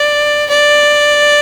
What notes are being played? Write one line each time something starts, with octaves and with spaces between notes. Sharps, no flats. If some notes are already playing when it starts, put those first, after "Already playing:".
Already playing: D5
D5